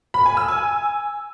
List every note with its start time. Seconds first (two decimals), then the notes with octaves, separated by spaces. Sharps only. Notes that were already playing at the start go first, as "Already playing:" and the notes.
0.14 B5
0.26 G#5
0.37 E6
0.48 G#5